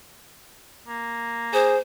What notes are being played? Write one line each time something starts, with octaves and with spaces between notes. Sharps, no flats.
A#3
G#4 C5